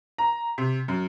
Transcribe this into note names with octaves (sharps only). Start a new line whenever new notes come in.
A#5
C3
F#2